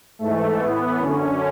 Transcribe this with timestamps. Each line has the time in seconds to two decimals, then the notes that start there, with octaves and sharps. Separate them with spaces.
0.19 G#2 E3 A3
0.59 A2 E3 B3
0.99 F#2 D3 C#4